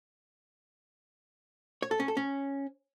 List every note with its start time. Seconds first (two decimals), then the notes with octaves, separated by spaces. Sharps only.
1.82 C#5
1.91 A4
2.00 C#4
2.08 A4
2.17 C#4